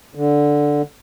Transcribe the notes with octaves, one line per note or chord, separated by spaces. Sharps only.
D3